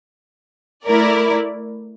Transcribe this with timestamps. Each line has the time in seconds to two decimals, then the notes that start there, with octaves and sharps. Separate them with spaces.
0.86 A3 E4 A#4 D5